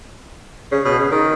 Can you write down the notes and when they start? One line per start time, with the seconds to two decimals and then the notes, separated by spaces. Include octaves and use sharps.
0.72 C#3
0.85 B2
0.98 C#3
1.12 D#3